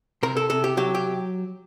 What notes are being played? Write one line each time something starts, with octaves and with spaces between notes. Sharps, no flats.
C3 A#4
A4
C3 A4
G4
F#3 G4
G4